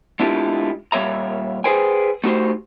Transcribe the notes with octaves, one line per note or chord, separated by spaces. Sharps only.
G#3 D4 E4 F4 G4
A#2 G3 C#5 E5 A#5
G#4 A4 B4 C5 G5 G#5
A3 D#4 F#4 G4 C5